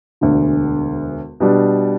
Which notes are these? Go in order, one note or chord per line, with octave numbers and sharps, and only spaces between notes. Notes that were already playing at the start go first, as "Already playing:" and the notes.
E1 D2 D3
B2 G3 D4